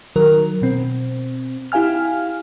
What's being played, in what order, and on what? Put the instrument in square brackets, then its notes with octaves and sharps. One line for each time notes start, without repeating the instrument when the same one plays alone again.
[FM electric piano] D#3 F#3 A#4
B2 C4
E4 G4 F5 G#5 F6